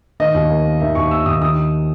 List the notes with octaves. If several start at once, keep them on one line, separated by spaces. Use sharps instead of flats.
D#3 D#5
D#2
A#3
A#3
D#3 E5
D#2 C#6
A#3 E6
D#2 D#6
D#3 D#6